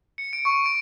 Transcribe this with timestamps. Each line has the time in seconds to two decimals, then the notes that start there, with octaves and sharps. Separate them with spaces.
0.18 C#7
0.33 D7
0.45 C#6
0.66 D7